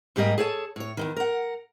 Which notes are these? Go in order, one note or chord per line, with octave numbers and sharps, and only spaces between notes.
G#2 G3 A#3 G4 D#5
G#4 A4 C#5 G5 A5
A2 C#5
E2 G#2 D#3
A#4 F#5